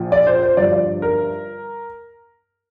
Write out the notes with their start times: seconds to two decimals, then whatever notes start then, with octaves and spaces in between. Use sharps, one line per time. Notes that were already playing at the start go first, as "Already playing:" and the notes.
Already playing: A#1 A#2 F3
0.12 D5
0.27 C5
0.42 C5
0.57 G1 G2 F3 D5
0.72 D5
1.02 A#4